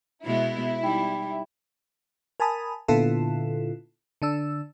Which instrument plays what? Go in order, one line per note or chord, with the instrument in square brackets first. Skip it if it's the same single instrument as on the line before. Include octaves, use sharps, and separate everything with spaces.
[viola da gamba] B2 G#3 B3 [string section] E4
[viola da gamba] G3 [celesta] D#4 G5 B5
[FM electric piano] A#4 G#5 A5 B5 D#6
A#2 D3 B3 E4 F4 A4
D3 D4 E6